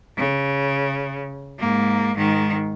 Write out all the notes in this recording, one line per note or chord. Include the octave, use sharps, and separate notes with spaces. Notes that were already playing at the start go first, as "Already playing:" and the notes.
C#3
G#2 A#3
G#2 D#3